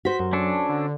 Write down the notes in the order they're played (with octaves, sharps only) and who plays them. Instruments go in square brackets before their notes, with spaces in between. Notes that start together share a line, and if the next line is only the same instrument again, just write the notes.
[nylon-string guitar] F#4 C5 [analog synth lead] B6
[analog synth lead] F#2
[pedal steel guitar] C#4 D4 A4
[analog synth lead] D3